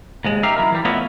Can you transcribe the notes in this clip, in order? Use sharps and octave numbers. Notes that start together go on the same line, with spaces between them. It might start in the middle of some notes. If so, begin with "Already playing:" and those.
D#2 G#2 G#3
D#4 G4 E5 F5
F#3 E4 A#4
E3 G3
A3 B3 E4 F4 C#5 D#5